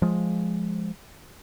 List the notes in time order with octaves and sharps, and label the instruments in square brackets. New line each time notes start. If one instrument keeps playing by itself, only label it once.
[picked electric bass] F3 G#3